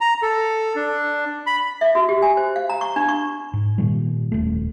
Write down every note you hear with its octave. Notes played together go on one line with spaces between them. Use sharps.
A#5
A4
D4
B5
E5
F#4
G4
G#5
C5
F5
A#5
C#6
D4
C#6
G#2
A#2 D#3 G3
D#1 C#2 A3